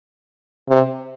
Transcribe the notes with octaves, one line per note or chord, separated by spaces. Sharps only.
C3